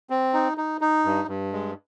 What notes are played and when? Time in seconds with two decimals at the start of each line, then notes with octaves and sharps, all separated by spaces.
0.10 C4
0.34 D#4
0.58 D#4
0.81 D#4
1.05 G2
1.28 G2
1.52 G#3